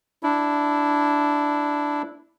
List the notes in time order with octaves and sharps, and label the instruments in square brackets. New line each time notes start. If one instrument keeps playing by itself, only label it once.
[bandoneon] D4 E4